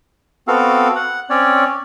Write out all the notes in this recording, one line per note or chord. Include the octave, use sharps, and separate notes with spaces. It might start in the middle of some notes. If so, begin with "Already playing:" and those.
B3 C4 F#4 A4 F5
F#5
C4 C#4 C#5 D5